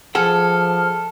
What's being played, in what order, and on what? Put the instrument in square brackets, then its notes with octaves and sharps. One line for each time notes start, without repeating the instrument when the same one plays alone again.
[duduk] F3 [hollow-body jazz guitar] G#4 F#5 G5 [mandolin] A4 [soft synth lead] F6